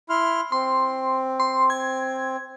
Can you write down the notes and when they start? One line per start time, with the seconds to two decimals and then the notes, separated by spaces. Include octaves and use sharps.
0.09 E4 C6 F6
0.52 C4 C6
1.40 C6
1.70 G#6